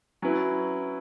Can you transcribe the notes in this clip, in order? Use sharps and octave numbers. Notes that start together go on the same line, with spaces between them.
F#3 C#4 E4 B4